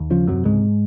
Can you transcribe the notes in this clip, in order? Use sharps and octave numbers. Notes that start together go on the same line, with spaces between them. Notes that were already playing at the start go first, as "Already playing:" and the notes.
Already playing: D#2
C#3 F3
F#2 C3 F#3
C#2 G#2 G#3